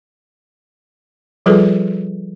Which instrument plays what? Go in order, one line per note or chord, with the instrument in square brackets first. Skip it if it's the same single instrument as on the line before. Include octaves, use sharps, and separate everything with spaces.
[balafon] F3 G3 F4 G#4 A4 B4